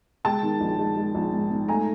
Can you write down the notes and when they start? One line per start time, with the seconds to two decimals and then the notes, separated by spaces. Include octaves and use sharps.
0.25 G#3 G5 A5
0.43 D#3
0.61 A#1
0.78 G#3
0.96 G#3
1.15 A#1
1.33 G#2
1.50 G#2
1.68 A3 G#5 A#5